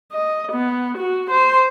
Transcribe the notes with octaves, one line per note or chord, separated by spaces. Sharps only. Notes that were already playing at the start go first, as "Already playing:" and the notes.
D#5
B3
F#4
C5